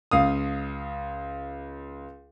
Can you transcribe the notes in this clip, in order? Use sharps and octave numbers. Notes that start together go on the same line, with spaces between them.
C#2 F5 D#6